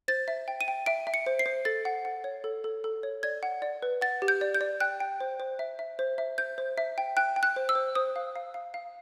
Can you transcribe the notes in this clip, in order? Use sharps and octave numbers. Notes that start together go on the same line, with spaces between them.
C5 A6
E5
G5
D#7
G5
E5 D7
E5
C#7
C5
C7
C5
A4 A6
F#5
F#5
C#5
A4
A4
A4
C#5
D5 G#6
F#5
D5
B4
F#5 A6
G4
G6
D5
G6
D5
G5 F#6
G5
C5
C5
E5
E5
C5
E5
C5 G6
C5
E5
G5
G5 F#6
G5
F#6
C5
E6
C5
C5 D#6
F5
F5
F5
F5